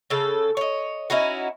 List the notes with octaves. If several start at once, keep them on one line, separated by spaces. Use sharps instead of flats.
C#3 A4
C#5 D#5
C#4 D#4 E4 F#4